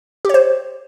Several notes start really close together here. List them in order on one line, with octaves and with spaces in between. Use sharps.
G4 C#5 C5